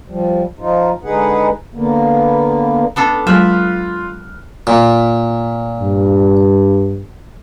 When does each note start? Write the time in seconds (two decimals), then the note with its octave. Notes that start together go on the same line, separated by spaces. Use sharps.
0.08 F3 G3
0.59 F3 D#4 F4
1.04 D3 G#3 D#4 G#4 B4 F#5
1.75 D3 A#3 B3
2.96 B3 D4 A4
3.27 F#3 G#3 F4 E5 F6 F#6
4.67 A#2
5.81 G2